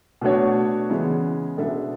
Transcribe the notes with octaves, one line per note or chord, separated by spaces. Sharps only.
B2 A3 D4 F#4 C#5
C#3 E3 G#3 B3
B2 G#3 D4 A4 E5